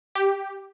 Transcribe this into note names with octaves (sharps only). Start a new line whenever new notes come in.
G4